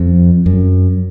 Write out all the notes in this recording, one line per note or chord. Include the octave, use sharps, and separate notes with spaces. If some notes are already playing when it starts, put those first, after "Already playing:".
Already playing: F2
F#2